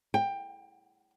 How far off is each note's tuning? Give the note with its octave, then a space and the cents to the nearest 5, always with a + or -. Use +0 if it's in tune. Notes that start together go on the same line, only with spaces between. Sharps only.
G5 +20